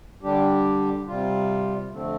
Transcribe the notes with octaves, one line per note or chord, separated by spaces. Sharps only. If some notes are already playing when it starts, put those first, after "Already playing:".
D3 G3 D4 G4
C3 G3 F4
F2 D3 A3 C4